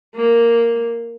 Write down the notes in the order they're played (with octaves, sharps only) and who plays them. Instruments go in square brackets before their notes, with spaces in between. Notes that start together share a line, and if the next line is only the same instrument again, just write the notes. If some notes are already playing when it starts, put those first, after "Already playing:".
[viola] A#3